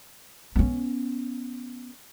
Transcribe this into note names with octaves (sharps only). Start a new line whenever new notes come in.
B3 C#4